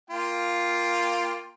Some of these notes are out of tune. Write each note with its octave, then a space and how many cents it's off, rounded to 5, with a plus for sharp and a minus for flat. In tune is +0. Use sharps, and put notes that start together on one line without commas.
A#3 +0 F4 +0 G5 +15